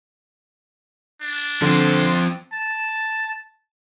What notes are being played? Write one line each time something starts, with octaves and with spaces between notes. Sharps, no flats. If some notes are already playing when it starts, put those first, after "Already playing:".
D4
D3 F3 C4 C6
A5